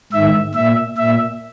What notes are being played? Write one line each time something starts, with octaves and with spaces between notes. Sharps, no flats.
G#2 D#3 E5
A#2 E5
A#2 E5